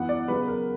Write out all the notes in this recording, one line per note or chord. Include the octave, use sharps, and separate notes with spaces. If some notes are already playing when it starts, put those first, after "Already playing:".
Already playing: F#2 E3 B3 F#5
D5
C#3 F#3 B3 B4
A#4